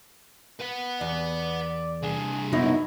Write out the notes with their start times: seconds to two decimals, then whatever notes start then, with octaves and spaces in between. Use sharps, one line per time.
0.61 B4 F#5
1.01 E2 D5
2.03 C2 D4 G#4
2.53 F#2 B3 D#4 E4 F#4